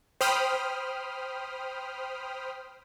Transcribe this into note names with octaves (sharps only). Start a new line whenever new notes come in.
C5 G5 B5 D#6 F6